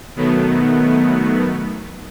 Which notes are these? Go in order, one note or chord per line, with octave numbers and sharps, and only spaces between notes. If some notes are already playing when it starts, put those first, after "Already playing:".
B2 D#3 F#3 A3 B3